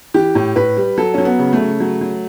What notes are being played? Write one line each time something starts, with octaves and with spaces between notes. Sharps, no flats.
E3 G4
A2
A2 B4
G3
F#3 A4
F#3 C#4
B3
C#3
A3
C#3
F#3
F#3